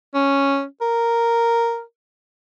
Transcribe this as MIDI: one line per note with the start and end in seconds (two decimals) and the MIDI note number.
0.15 0.65 61
0.81 1.82 70